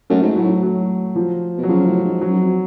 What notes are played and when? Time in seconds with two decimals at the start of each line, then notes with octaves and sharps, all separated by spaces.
0.10 F#2 A3
0.22 G#2
0.36 A2 F#3
0.63 F#3
1.15 F3
1.58 B2
1.63 F#3
1.69 C#3 F3
1.87 A2
2.04 G#2
2.21 F#3
2.29 F#2
2.40 F2